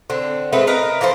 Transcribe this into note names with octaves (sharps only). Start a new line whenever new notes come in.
D3 C4
G#3 A3 C4 B4
A#4 B4 D#5
E3 F3 A4 C5